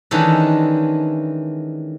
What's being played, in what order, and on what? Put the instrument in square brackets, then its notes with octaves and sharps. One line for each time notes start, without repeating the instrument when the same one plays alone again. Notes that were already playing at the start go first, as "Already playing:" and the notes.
[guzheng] D#3 E3 G#3 C#4 D4 A4